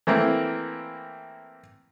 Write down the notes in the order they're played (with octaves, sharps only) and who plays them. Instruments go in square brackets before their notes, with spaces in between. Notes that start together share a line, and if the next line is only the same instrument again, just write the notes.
[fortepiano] E3 A3 A#3 C4 E4